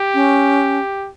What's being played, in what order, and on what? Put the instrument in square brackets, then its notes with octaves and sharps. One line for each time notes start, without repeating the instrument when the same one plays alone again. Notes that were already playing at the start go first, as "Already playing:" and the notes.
Already playing: [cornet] G4
[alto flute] C#4